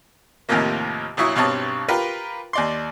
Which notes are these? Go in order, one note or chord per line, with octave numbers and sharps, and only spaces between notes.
D#2 A2 C3 D#3 F3 A#3
A#1 F#3 E4 C#6 D#6
B1 G2 C4 C#5 A5 D#6
F4 G4 A#4 B4
D#2 D5 C6